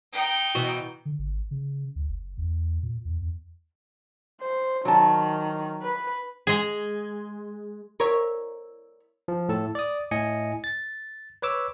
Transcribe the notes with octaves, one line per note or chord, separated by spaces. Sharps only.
D#4 G5
B2 E3 F#4
D3
G#1
C#3
D2
F#1
E2
A#2
E2
E2
C5
D#3 F#3 A5
B4
G#3 G#4
A#4 C#5 E5
F3
A2 A4 A5
D5 D#6
A2 D#5 G#5 C#7
A6
B4 C#5 D6 E6